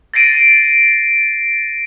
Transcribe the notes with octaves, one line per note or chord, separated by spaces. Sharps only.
A6 A#6 C7 D7 D#7